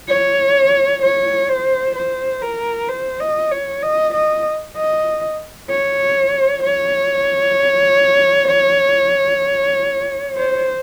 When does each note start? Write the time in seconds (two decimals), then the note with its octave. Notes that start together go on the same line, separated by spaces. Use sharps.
0.08 C#5
1.02 C#5
1.49 C5
1.95 C5
2.42 A#4
2.89 C5
3.20 D#5
3.51 C#5
3.82 D#5
4.14 D#5
4.76 D#5
5.69 C#5
6.63 C#5
10.37 C5